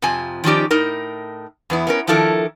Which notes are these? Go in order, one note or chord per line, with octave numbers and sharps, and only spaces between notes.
F2 C3 F3 G#5
D#3 F3 C#4 D#4 G4 D5
A2 D#4 A#4
E2 B3 E4
B3 C#4 A#4
D#3 F3 D4 E4 A4 A#4